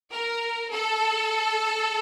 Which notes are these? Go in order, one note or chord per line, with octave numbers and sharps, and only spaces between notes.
A#4
A4